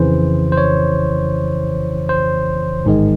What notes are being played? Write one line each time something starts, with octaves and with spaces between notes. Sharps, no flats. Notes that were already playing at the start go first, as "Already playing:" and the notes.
Already playing: F2 C#3 E3 C5
C5
C#5
C5
A1 G#2 D#3 G#3